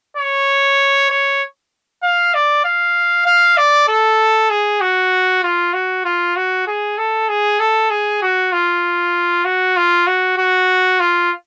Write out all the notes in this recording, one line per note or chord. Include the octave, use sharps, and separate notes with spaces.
C#5
C#5
F5
D5
F5
F5
D5
A4
G#4
F#4
F4
F#4
F4
F#4
G#4
A4
G#4
A4
G#4
F#4
F4
F#4
F4
F#4
F#4
F4